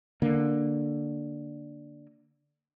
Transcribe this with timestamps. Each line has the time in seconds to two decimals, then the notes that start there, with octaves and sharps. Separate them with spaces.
0.22 D3 A#3